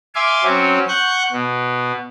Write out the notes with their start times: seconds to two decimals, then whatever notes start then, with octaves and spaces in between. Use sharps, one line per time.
0.15 E5 F5 G#5 C6 D6
0.44 F#3 C4 C#4
0.88 F#5 C#6 F#6 G6
1.32 B2